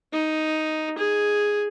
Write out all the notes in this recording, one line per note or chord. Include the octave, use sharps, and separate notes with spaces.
D#4
G#4